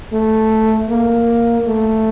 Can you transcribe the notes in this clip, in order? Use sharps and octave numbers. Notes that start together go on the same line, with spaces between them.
A3
A#3
A3